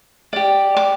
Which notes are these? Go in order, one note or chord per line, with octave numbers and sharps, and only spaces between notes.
G4 D5
D6